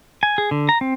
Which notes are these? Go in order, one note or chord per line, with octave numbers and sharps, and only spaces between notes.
G#5
G#4
D3
A#5
C4